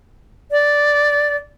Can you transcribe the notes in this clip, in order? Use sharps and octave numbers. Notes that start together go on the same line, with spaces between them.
D5